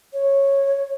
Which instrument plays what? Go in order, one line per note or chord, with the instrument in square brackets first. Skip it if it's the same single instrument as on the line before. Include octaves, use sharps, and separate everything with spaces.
[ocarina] C#5